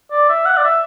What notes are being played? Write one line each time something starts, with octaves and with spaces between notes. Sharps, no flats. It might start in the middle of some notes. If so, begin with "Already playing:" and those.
D5
E5
F#5
D5
E5